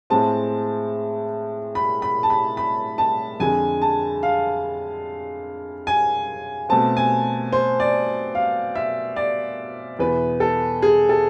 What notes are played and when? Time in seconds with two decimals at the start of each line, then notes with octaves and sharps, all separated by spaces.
0.10 A2 G#3 C4 A5
1.75 B5
2.02 B5
2.23 A5
2.30 B5
2.57 B5
2.98 A5
3.40 F2 D3 G#3 G#5
3.82 A5
4.23 F5
5.87 G#5
6.69 B2 A3 C4 A5
6.97 G#5
7.53 C5
7.80 D5
8.35 F5
8.75 E5
9.16 D5
9.99 E2 B2 B3 B4
10.40 A4
10.82 G#4
11.09 A4